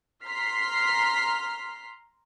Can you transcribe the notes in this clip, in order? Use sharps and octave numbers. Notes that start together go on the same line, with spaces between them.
A#5 C6 F6 B6 C7